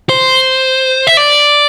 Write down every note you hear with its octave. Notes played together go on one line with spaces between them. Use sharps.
C5
E5
D5